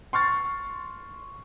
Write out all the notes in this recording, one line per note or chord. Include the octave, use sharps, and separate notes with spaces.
C6 C#6 F6 A6